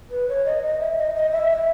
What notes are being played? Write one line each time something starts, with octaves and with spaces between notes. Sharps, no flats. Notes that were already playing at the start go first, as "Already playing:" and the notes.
B4
C#5
D#5
D#5
E5
D#5
D#5
E5
E5